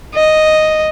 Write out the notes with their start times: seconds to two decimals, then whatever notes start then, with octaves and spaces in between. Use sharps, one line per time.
0.15 D#5